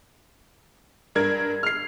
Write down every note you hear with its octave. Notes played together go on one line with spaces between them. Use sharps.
G2 A#4 G#6
F6 C7